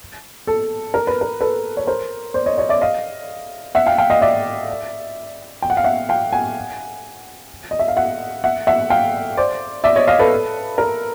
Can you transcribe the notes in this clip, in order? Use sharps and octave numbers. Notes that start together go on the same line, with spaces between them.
A4
A#4
B4
A#4
A4 B4
C#5
A#4 C5
C5 D5
C#5 D#5
C#5 D#5
D5 E5
D#5 F5
E5 F#5
F5 G5
F5 G5
D#5 F5
D5 E5
G5
F#5
F5
E5 F#5
F5 G5
F#5 G#5
D#5
E5
F5
E5 F#5
E5 F#5
E5 F#5
F5 G5
C5 D5
D5 E5
C#5 D#5
D#5 F5
A4 B4
A#4